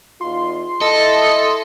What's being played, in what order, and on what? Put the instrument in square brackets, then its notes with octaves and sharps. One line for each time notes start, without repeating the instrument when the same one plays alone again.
[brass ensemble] E2 D#4 F4 [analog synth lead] C6
[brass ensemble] E4 A5 [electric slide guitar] A4 [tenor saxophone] D#5